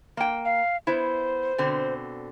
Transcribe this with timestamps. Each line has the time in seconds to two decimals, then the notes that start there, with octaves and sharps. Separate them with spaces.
0.17 A#3 G5
0.45 F5
0.87 B3 E4 C5
1.58 B2 D3 C4